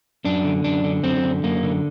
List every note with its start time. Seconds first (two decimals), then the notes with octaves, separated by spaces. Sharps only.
0.25 F#2 D4
0.45 D3
0.64 F#2 D4
0.84 D3
1.03 F#2 C4
1.24 D3
1.43 F#2 A#3
1.63 D3